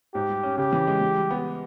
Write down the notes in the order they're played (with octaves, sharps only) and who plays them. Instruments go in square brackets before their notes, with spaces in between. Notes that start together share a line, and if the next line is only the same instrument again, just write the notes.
[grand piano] G#2 [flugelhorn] G4
[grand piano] G3
C#4
[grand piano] C#3 [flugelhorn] G4
[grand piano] E3
G#3
E3
G3
B3